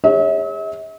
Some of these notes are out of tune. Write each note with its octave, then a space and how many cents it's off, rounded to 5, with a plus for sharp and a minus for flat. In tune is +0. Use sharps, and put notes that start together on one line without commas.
G#4 -40 C#5 +0 E5 -45